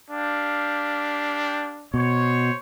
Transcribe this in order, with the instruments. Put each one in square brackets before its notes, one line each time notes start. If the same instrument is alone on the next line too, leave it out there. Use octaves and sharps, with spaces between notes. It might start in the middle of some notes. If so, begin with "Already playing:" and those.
[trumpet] D4 [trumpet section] G4 F5
[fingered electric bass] B2 [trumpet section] C5 C#5